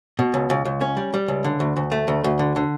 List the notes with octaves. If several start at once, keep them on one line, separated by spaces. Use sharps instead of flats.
B2
C#2
C#2
C#2
C#4
G3
G3
C#2
D3
D2
D2
A3
D2
D2
D3
D3